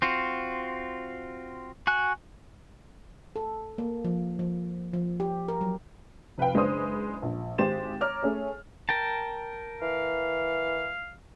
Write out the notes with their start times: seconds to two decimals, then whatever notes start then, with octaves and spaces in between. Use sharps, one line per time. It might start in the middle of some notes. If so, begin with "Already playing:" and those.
0.02 C4 F4 F#4
1.87 F#4 G#5 F#6
3.36 A4
3.78 A#3
4.05 F3
4.39 F3
4.93 F3
5.20 G4
5.48 A#4
5.61 F#3
6.38 F1 B4 F5 G5
6.54 F#1 G#3 D4 B4 C5 D#6
7.22 A#1
7.58 G#1 G#3 G4 C5 A6 E7
8.01 C#5 A#5 D6 F6
8.23 A3 C#4 G#4 C#5
8.89 A#4 G5 A5
9.82 E3 F5